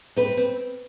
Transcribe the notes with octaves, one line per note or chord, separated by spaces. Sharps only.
C4 B4
C4